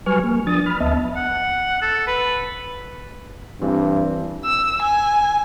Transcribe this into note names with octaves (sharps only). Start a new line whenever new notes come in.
F#3 G3 B4 G#5 C#6 F6
A#3
F3 D4 D#6 A6
B5 F6
D2 B3 D#5 E5 A5
F#5
A4
B4
G2 E3 C4
E6
G#5